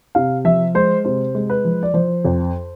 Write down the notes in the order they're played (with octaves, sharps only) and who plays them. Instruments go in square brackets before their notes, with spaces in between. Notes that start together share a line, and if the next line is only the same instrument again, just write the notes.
[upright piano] C3 [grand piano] F5
[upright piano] F3 [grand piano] E5
[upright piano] G#3 [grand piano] C5
[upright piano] C3 [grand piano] C5
[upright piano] G#3
[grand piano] B4
[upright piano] F3
[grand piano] D5
[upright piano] F3 [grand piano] C5
[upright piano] F2